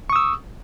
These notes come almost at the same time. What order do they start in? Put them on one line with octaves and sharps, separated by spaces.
C#6 D#6 E6